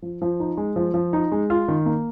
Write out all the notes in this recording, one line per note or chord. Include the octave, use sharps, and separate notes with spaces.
F3
F3
D#4
G#3
F3
F3
D#4
G#3
F4
D#3
A#3